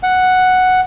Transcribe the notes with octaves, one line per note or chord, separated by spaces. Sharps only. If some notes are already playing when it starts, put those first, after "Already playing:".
F#5